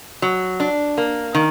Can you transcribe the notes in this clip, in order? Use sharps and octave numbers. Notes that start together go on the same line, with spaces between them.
F#3
D4
A#3
D#3